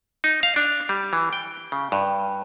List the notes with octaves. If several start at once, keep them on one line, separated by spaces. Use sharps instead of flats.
D#4
F5
D4
G3
E3
G5
C#3
G2